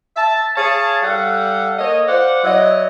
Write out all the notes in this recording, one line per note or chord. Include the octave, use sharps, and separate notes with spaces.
E5 A5
G#4 C#5 F5 A5
G3 A4 F5 F#5
A#3 A4 C#5 D#5
C5 D5 F5 F#5
F#3 E4 D5 D#5